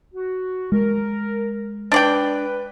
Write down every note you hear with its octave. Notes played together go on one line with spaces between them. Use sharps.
F#4
G#3 A#4
D4 B4 D5 G5